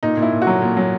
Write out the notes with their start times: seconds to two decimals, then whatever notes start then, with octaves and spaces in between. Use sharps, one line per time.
0.03 A#2 D#4
0.17 A#2
0.22 E4
0.32 A#2
0.42 F#4
0.47 F#3
0.62 A#2
0.77 F#3